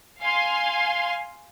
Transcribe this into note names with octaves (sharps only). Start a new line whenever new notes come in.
F5 G#5 C6